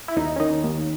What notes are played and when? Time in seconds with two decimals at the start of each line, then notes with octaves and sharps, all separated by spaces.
0.08 E4
0.16 D#2 D#4
0.36 C#4
0.40 D#3 D#4
0.64 D#2